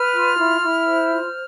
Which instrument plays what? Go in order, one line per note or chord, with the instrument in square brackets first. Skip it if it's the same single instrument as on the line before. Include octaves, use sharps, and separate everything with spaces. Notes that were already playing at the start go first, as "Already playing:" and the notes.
Already playing: [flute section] B4 F6
F4
E4
E4
C5
F4